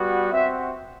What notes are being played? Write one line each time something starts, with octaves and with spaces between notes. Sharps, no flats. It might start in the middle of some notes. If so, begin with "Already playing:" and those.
Already playing: G3 B3 F#4
C4 F#4 E5